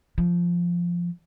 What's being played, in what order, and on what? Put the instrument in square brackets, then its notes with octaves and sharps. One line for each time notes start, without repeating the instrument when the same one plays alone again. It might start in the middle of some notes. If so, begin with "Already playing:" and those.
[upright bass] F3